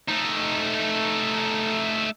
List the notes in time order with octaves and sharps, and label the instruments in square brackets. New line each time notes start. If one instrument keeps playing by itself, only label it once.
[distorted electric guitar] A3 D#4